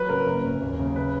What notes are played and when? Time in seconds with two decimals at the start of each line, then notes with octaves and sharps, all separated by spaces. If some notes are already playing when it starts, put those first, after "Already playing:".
Already playing: F#3 B4
0.09 C#3 A#4
0.26 F#1
0.44 F#2
0.62 D#2
0.79 C#3
0.96 B4